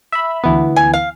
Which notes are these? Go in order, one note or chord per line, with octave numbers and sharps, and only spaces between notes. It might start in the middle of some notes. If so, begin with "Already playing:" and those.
E5 B5
D2 E3 B3
G#5
F5